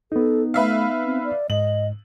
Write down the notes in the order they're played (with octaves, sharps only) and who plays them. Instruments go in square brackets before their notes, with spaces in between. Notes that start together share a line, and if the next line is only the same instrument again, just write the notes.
[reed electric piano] B3 D#4 [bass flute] A4
[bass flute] A3 [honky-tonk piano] B4 E5 F5
[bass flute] C4
D5
[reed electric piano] G#2 [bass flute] D#5 [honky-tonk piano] F#7